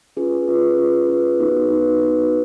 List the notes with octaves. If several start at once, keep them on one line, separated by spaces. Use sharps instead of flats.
C#4 F4 G#4 B4
C#4 F4 G#4 B4
C#4 F4 G#4 B4
C#4 F4 G#4 B4
B3 D#4 F#4 B4
B3 D#4 F#4 B4
B3 D#4 F#4 B4